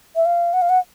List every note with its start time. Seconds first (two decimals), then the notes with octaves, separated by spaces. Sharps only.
0.16 E5
0.26 F5
0.53 F#5
0.62 F5
0.69 F#5